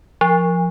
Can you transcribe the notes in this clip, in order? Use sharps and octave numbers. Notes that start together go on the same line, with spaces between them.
F3